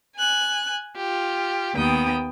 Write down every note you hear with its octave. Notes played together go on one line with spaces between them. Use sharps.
G#5 F#6
F4 G4
D#2 B3 G5 D#6